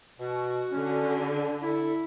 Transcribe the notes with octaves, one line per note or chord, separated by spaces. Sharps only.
B2 F#4
D3 C#4
E4 A4